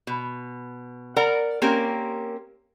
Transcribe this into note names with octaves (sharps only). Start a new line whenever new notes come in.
B2
A#4 D5 F#5 A#5
A#3 C4 C#4 G4 A#4